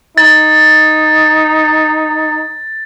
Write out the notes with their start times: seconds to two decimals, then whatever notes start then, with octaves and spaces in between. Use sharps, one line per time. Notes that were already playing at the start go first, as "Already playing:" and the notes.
0.18 D#4 A6